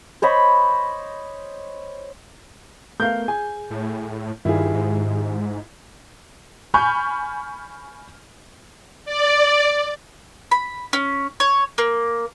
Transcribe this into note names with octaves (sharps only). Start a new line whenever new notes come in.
C5 C#5 D#5 B5
A3 B3 A#4 F5 G6
G#4 G#5
A2
G2 D#3 E4 F4 G4 G#4
G#2
G#5 B5 C#6 F6 G6
D5
B5
C#4
C#5
A#3